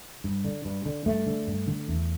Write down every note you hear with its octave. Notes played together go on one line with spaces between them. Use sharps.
G2
D3
G2
D3
G2 A3
D3
G2
D3
E2